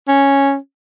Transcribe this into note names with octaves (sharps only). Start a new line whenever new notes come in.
C#4